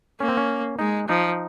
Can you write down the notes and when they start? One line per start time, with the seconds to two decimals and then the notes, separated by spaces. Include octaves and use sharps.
0.20 A#3 C#4
0.28 C4
0.37 C#4
0.79 G#3 D#4
1.09 F3 D#4